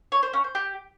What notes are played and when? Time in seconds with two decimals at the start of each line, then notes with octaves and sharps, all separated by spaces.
0.12 C#5
0.23 C5
0.33 C#4
0.44 C5
0.55 G4